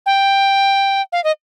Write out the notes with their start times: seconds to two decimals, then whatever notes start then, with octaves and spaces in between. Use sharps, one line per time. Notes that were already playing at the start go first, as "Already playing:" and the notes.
0.06 G5
1.12 F5
1.24 D#5